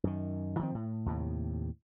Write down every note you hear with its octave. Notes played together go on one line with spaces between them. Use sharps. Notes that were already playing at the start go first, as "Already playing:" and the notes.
F#2 D#3
D#3 F3 C4
A2
D#2 A2 C3